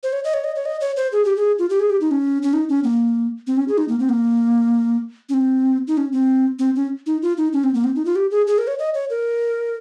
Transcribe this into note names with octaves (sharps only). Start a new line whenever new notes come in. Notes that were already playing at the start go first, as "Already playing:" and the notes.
C5
C#5
D#5
C#5
D#5
C#5
D#5
C#5
C5
G#4
G4
G#4
F4
G4
G#4
G4
D#4
C#4
C#4
D#4
C#4
A#3
C4
C#4
G#4
D#4
A#3
C4
A#3
C#4
C4
D#4
C#4
C4
C4
C#4
D#4
F4
D#4
C#4
C4
A#3
C4
D#4
F4
G4
G#4
G#4
A#4
C#5
D#5
C#5
A#4